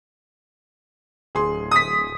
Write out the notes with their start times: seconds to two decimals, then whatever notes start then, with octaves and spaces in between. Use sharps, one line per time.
1.35 D1 G#4 C6
1.71 D#6 B6